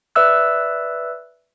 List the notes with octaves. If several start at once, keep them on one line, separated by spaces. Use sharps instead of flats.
B4 D5 E5 E6 F#6